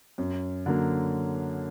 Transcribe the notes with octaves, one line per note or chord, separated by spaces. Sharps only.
F#2
D3 F#3 A#3